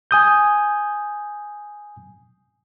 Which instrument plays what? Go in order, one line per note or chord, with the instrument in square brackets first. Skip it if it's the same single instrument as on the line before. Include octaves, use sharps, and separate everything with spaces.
[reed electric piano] G#5 D#6 G6